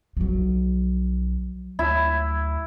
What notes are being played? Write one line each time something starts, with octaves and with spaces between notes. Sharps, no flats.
B1 F3 F#3
D2 E4